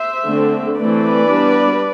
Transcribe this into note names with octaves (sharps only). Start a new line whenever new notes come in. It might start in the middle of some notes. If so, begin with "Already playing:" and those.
Already playing: C5 E5
D3 A3 C4
E3 A3 C4 B4 D5
G3 B3 D4